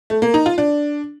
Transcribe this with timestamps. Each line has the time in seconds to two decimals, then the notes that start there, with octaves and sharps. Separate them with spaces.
0.10 A3
0.22 A#3
0.34 D#4
0.46 F4
0.58 D4